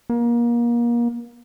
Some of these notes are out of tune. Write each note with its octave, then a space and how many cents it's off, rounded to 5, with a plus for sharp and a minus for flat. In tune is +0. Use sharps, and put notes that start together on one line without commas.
A#3 +30